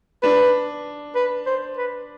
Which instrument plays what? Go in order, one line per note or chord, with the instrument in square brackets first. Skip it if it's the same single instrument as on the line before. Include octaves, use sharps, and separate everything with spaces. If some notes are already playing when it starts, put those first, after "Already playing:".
[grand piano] D4 [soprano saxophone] B4
[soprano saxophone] B4
C5
B4